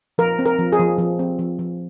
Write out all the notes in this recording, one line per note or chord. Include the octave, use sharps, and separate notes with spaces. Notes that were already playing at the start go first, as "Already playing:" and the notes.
F3 A#4
C4
A#4
F3
G#4
F3
F3
C4
F3
F3